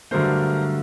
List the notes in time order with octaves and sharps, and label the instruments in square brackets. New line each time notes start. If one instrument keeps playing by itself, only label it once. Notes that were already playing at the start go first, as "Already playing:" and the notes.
[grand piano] G2 D3 F#3 A3 A#4 C5